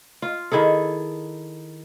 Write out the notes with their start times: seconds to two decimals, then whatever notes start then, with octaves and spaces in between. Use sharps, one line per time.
0.22 F4
0.52 D#3 E4 G#4 A4